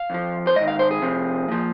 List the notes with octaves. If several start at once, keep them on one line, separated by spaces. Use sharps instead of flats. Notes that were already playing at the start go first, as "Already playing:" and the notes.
Already playing: F5
F2 F3
C5
G#2 D#3 D#5
F5
C5
G#4
F2 C3 F3
A#2 F3